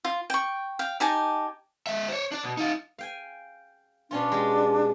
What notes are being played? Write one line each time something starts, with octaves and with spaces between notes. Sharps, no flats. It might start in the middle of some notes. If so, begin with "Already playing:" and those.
F4
G5 C#6
F5 G5
D#4 G4 G#5 A5
G#3 E5
C5 C#5
D4 D5
B2
D#4 F4
F5 G5 G#5
B2 C#4 D4 F4
G#3 G4